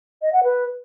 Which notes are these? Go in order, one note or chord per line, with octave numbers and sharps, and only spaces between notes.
D#5
F#5
B4